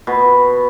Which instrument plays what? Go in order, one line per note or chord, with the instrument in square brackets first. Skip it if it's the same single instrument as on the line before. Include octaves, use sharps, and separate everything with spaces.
[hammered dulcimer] B2